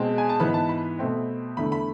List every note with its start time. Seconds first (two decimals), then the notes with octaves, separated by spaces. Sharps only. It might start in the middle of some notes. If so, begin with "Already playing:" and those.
Already playing: B2 G#3 C4 A5
0.18 G#5
0.29 A5
0.40 G#2 E3 B3 B5
0.54 A5
0.69 B5
0.99 B2 A3 C4
1.57 E2 D3 A3 B5
1.72 B5